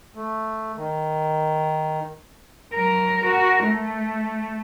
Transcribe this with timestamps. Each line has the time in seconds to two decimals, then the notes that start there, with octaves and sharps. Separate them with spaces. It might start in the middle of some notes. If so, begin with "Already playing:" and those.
0.15 A3
0.76 D#3
2.75 F#3 A#4
3.25 F#4 A#4
3.65 A3